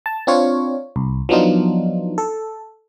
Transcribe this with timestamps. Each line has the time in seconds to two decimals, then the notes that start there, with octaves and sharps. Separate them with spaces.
0.06 A5
0.27 C4 D4 F4 C#5
0.96 C2
1.29 F3 F#3 B3 D4 D#4 F4
2.18 A4